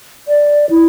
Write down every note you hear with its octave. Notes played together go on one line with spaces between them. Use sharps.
D5
E4